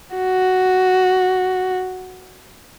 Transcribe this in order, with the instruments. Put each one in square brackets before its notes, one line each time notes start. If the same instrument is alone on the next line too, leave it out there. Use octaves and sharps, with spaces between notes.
[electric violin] F#4